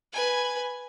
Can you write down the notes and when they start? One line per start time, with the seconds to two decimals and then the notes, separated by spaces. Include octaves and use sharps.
0.13 B4 G#5